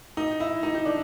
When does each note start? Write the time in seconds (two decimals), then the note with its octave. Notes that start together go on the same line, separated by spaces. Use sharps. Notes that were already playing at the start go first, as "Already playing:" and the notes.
0.17 D#4
0.40 E4
0.63 D#4
0.75 D#4
0.85 D4